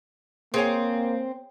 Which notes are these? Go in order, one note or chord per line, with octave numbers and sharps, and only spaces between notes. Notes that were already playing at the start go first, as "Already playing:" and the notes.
A#3 C4 G#4 C#5 G#5